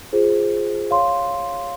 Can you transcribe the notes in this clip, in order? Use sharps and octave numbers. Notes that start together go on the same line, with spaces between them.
F4 G#4 C5
C#5 F5 C6